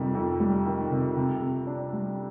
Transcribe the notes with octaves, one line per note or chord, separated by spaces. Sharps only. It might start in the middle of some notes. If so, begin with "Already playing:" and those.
Already playing: F2 C3 D#3 G3
F2
G3
D#3
C3
C3
C3
D4
G3